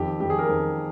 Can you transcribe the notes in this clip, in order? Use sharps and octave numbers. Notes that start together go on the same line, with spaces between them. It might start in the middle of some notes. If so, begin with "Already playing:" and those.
Already playing: F2 D#3 G4
F2 D#3 G4
G#4
A#4
F2 D#3